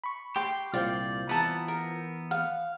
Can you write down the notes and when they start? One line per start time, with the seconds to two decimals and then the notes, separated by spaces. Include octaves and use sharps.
0.04 B5 C#6
0.36 G4 G5 C6
0.74 C2 A#2 F4 C5 D5 F5 G5 G6
1.29 E3 B3 B4 A5 A#5
1.68 A#4
2.31 F5 F#5